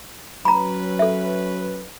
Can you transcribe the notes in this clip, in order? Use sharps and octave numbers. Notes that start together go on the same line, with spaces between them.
F#3 C#4 B4 A#5 B5
A4 E5